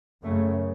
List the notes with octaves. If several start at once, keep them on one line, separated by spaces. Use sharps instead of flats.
F#2 C#3 A3